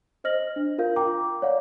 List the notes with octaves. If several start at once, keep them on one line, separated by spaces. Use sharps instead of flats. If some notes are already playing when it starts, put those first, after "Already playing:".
C5 D#5 F6 A#6 F#7
D4
F4 A#4 F5 G6
G5 A#5 D6
C#5 D5 F5 F#5